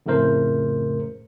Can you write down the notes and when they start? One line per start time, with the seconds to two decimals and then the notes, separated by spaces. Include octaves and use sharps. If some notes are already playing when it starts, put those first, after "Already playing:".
0.06 F2 A2 C#3 A3 A#4 C5